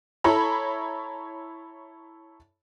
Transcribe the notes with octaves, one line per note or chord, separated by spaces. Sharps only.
E4 A4 C#5 A#5 B5